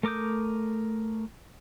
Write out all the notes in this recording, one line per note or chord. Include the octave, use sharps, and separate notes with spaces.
A3 A#4 D6 D#6 G6